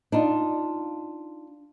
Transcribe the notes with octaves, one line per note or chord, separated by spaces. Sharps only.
D4 D#4 F4